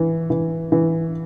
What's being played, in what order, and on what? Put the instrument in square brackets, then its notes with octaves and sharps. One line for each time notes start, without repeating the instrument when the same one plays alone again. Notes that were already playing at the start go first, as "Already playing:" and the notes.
Already playing: [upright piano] E3
E3
E3